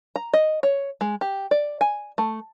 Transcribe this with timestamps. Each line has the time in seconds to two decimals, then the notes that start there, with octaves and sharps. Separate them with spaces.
0.16 A#5
0.33 D#5
0.63 C#5
1.01 G#3
1.21 G4
1.51 D5
1.81 G#5
2.18 A3